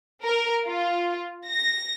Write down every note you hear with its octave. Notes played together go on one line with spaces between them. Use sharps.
A#4
F4
A#6